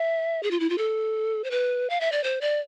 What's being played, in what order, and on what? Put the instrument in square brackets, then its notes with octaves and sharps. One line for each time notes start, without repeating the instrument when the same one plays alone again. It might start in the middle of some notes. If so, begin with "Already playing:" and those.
Already playing: [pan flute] E5
G#4
F4
E4
F4
A4
C5
B4
F5
E5
D5
C5
D5